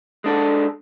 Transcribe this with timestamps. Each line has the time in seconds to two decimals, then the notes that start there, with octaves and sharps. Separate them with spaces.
0.24 G#3 D4 A4